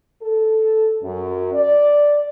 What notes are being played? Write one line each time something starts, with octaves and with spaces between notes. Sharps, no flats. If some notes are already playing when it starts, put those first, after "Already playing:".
A4
F#2
D5